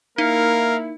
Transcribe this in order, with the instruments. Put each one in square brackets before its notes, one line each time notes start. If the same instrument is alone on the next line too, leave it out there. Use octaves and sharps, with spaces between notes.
[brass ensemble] A#3 E4 [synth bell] D#4 [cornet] A#4 [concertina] F5